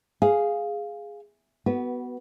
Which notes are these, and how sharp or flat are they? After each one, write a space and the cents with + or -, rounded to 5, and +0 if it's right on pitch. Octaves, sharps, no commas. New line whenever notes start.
G#4 +0 F5 +0
B3 +0 F#4 +20 B4 -15